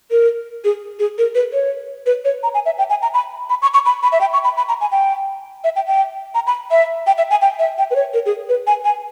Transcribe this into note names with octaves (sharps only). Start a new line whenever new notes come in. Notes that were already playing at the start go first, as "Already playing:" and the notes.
A#4
G#4
G#4
A#4
B4
C#5
B4
C#5
A#5
G#5
E5
G5
G#5
A#5
B5
B5
C#6
C#6
B5
B5
E5
G5
C#6
B5
B5
A#5
G#5
G5
E5
G5
G5
A#5
B5
E5
G5
E5
G#5
G5
E5
G5
B4
C#5
A#4
G#4
B4
G#5
G#5